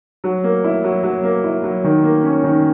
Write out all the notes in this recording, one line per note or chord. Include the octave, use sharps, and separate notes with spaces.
F#3
A#3
E4
F#3
F#3
A#3
E4
F#3
D#3
A#3
C#4
D#3